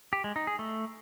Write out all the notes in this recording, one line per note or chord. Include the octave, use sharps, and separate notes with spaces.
G4
G#3
D#4
G#4
A3